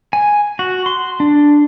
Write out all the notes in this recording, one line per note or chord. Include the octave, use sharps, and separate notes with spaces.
G#5
F#4
C6
D4